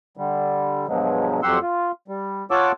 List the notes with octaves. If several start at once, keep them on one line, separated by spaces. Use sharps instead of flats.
D3 G3
G2 B2 F3 F#3 G#3
F2 F#3 G4 F#5 C6 E6
F4
G3
F4 C#5 F#5 A5 D6 E6